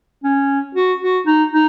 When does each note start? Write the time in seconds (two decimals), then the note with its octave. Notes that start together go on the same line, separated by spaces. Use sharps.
0.24 C#4
0.75 F#4
1.01 F#4
1.27 D#4
1.52 D#4